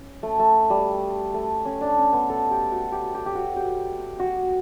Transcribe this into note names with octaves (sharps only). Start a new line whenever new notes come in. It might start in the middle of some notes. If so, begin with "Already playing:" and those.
Already playing: C#4
A3
A3
G3
A3
C#4
D4
C#4
B3
A4
G4
F#4
G4
G4
G4
F#4
G4
F#4